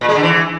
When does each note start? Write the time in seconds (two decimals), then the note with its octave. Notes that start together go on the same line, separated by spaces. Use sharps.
0.01 A#2
0.08 G#3
0.16 D3
0.23 E3